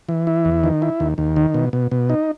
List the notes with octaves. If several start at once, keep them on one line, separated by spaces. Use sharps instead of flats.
E3
E4
E2
D#3
E4
D#2
D#2
D#3
B2
B2
B2
D#4